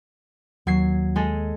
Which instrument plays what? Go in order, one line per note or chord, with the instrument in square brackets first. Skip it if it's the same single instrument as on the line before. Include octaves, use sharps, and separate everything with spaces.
[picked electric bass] D#2 [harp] F#3 G#6 C7
[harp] G#3 G#4 A4